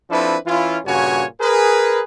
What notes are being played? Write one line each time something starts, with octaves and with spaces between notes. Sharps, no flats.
F3 C4 D4 E4 A4 B4
E3 C#4 E4 F4
G2 A#2 C#3 F#4 C#5 G#5
G#4 A#4 B4